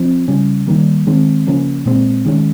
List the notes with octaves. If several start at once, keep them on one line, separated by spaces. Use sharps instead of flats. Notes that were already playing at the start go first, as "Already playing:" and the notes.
Already playing: F3 C4
C#3 G3 C#4
D#3 G3 A#3
D#3 G#3 C4
C#3 F3 A#3 C#4
A#2 G#3 C4
D#3 G#3 C#4